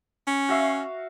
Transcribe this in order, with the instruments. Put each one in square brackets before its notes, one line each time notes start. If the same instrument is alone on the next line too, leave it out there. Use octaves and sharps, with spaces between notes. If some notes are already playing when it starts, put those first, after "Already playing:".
[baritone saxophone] C#4
[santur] F#4 E5 F5